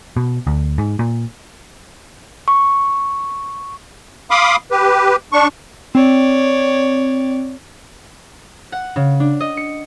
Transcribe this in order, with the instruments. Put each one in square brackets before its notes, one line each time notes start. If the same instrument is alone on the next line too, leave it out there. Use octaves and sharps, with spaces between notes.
[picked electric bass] B2
D2
G#2
A#2
[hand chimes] C#6
[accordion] F5 B5 C6 D6 D#6
G4 B4
D4 C#6
[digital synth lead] C4 [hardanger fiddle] C#5 D5
[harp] F#5
C#3
D4
D#5
C#7